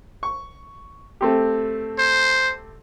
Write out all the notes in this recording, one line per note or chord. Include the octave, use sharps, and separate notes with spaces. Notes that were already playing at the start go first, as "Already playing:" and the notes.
C#6
A3 C4 G4
C5